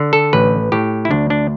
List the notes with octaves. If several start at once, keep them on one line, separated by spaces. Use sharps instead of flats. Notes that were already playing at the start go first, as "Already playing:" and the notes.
Already playing: D3
A4
A1 B4
A2 G4
E4
D2 D4
D4